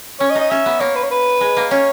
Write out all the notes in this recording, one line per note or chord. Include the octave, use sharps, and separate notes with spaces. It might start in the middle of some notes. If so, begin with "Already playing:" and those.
C#4 C#5
D#5
D#4
D#5
C#4 E5
B3
A#3 C#5
B4
C#5
B4
G#3
A#3
C#4 C#5